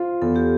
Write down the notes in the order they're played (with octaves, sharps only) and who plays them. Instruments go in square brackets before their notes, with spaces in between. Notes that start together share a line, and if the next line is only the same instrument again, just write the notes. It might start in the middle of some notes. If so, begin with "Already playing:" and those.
Already playing: [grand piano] F4 [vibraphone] C5
[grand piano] E2 [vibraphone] A4
[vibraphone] G4